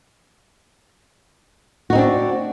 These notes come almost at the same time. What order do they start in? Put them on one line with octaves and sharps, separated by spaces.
F#4 D#4 C4 D4